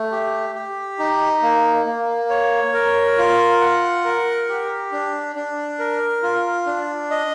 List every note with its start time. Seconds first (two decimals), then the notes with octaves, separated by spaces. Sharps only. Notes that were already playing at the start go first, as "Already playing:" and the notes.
Already playing: A3
0.12 G4
0.55 G4
0.99 D#4
1.43 A#3
1.86 A#3
2.30 C#5
2.74 A#4
3.18 F4
3.61 F#5
4.05 A#4
4.49 G4
4.92 D4
5.35 D4
5.79 A#4
6.23 F4
6.66 D4
7.10 D#5